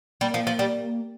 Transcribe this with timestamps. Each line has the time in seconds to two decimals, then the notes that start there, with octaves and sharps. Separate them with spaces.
0.21 G3 A#3
0.34 F3
0.47 F3
0.59 G3